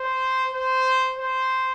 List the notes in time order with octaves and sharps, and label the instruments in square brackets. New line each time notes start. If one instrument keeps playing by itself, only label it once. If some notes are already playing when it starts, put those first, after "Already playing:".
Already playing: [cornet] C5
C5
C5